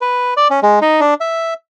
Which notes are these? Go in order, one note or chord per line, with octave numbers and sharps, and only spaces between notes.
B4
D5
C#4
G#3
D#4
D4
E5